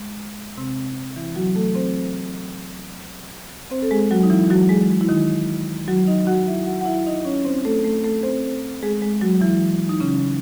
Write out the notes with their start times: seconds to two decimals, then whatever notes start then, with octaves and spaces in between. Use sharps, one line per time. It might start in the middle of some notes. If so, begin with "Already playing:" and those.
Already playing: G#3
0.57 C3 C4
1.16 E3 E4
1.36 F#3 F#4
1.55 A3 A4
1.75 C4 C5
3.71 C4 C5
3.82 A4
3.91 G#3 G#4
4.11 F#3 F#4
4.23 D#4
4.30 E3 E4
4.50 F#3 F#4
4.69 G#3 G#4
5.01 E4
5.09 D#3 D#4
5.88 F#3 F#4
6.07 D#4 D#5
6.27 F#4 F#5
6.47 E4 E5
6.66 F#4 F#5
6.81 F#5
6.85 E4 E5
7.06 D#4 D#5
7.25 C#4 C#5
7.45 C4 C5
7.65 A3 A4
7.84 A3 A4
8.04 A3 A4
8.23 C4 C5
8.83 G#3 G#4
9.02 G#3 G#4
9.21 F#3 F#4
9.41 E3 E4
9.89 D#4
10.00 C#3 C#4